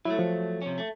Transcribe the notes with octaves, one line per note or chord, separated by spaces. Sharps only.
F#3 A3 E4
F3
C3 C#4
A3